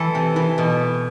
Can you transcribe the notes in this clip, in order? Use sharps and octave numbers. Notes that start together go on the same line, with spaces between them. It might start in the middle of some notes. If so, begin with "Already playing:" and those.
Already playing: E3 A4
C3
E3
B2